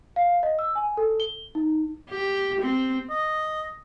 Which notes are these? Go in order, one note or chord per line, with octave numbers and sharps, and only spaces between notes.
F5
D#5
E6
G#5
A4
G7
D#4
G4
C4
D#5